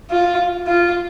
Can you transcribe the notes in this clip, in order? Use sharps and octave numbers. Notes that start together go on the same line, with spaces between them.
F4
F4